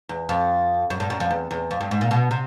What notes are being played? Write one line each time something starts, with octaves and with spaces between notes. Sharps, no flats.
E2
F2
F#2
G2
F#2
F2
E2
E2
F2
G2
G#2
A#2
B2
C3